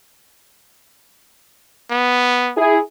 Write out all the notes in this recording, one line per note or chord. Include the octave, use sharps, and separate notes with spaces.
B3
E4 G#4